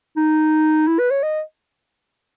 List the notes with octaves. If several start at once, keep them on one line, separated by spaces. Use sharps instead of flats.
D#4
E4
B4
C#5
D#5